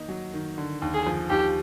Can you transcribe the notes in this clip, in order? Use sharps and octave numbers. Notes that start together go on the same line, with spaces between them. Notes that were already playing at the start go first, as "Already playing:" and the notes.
Already playing: D#3 A#3 D#4
F#3
D#3
D3
D#2
G#4
F3
D#2 G4